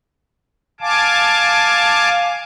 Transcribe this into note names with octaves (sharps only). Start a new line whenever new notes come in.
F5 G#5 A5 D6